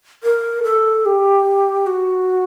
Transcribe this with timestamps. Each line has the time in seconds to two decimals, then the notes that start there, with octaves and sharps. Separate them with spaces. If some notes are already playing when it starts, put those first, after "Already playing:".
0.23 A#4
0.63 A4
1.06 G4
1.87 F#4